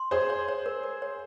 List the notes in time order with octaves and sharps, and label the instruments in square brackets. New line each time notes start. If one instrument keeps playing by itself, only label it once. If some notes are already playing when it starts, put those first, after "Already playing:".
Already playing: [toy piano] C6
[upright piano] G#4 C5 [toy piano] C#5
[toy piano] C#5
C#5
A#4
A#4
C#5